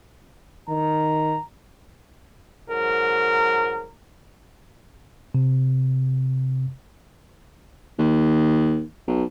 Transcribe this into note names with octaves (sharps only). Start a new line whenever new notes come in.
D#3 A#5
G#2 F#3 A#4
C3
D#2
B1